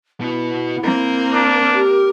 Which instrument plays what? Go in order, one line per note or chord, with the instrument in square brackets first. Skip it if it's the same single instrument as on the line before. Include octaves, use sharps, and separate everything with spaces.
[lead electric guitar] B2 B3 [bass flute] E4
[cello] A#3 C4 [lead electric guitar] A#4
[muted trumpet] D4
[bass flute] G4